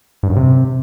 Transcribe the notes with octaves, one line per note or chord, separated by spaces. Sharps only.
G2
F#2
C3